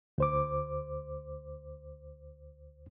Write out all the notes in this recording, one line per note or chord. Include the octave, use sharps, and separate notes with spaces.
D2 C5 D6